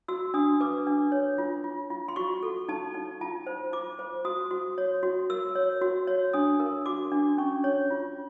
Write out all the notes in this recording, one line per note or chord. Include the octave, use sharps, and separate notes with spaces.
F#4 E6
D4 D#6
B4 D6
D4
C#5
F4
F4
F4
C6
F#4 C#6
A4
D#4 A5
D#4
F4 A5
C5
F4 D6
C5
F#4 D#6
F#4
C#5
F#4
A#4 E6
C#5
F#4
C#5
D4 D#6
A#4
F#4 D6
D4
C#4 C#6
C#5
F4